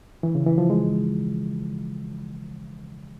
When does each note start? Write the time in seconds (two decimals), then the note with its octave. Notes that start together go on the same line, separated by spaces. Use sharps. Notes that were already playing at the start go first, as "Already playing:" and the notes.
0.23 E3
0.35 C#3
0.46 E3
0.58 F3
0.70 G#3